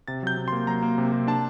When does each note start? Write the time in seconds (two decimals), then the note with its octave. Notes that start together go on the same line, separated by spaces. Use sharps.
0.08 C3 A6
0.23 F#3 G6
0.37 C3
0.48 C6
0.52 A#3
0.67 F#3 A#5
0.83 A#3
0.98 C3
1.12 C3
1.27 D4 A5